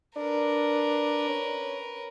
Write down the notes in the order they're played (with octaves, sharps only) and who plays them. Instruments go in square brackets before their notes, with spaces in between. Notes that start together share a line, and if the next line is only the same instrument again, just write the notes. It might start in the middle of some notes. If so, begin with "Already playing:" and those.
[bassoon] D4 [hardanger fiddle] A#4 B4
[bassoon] C#4